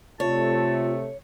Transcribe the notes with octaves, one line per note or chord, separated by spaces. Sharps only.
C3 A3 F4 C#5 A5